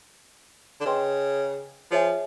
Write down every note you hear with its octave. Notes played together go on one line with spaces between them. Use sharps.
D3
C#3 B4 D#5 G5 C6
F3 G#4 C#5 E5 G#5